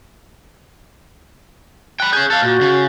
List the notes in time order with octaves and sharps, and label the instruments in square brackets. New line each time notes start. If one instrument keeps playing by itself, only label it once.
[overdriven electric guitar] G5 B5 [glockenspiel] F#6
[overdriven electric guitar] C#4 G#4 [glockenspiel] G6
[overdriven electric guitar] A4 F5 [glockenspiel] A6
[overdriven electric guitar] A#2 [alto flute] F#4
[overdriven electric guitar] C#3